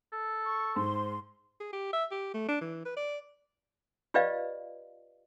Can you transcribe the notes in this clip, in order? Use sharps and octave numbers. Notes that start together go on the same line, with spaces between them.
A4
C#6
G#2 C5 C6
G#4
G4
E5
G4
A3
D4
E3
B4
D5
F4 G4 B4 D5 D#5 F5